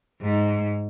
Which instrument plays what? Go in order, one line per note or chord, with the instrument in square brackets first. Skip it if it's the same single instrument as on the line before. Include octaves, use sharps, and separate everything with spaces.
[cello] G#2